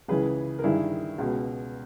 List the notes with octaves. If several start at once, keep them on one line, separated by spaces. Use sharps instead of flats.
C#2 C#3 E3 G#4 B4
A#4
G2 D#3 E4 G#4
C#2 B2